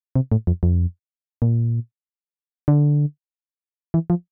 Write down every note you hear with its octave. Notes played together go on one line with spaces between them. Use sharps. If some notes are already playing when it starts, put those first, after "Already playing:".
C3
A2
F2
F2
A#2
D3
E3
F3